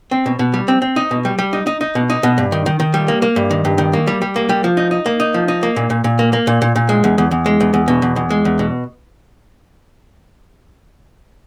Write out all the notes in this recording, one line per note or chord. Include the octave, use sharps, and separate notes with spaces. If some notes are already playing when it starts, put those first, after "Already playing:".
C4
B2
B2
G3
C4
C4
D#4
B2
G3
G3
D#4
D#4
D#4
B2
D#4
B2
G2
D#3
D#3
D#3
G3
A#3
A#3
G2
D#3
G2
D#3
A#3
G3
G3
A#3
G3
F3
D#4
D#4
A#3
D#4
F3
D#4
A#3
A#2
A#2
A#2
A#3
A#3
A#2
A#2
A#2
G#3
E2
E2
E2
G#3
E2
E2
B2
E2
E2
G#3
E2
B2